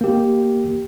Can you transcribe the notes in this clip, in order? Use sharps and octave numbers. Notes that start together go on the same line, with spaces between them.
A#3 G4